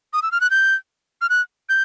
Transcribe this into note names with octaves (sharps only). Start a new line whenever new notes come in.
D#6
E6
F6
F#6
G6
F6
F#6
G6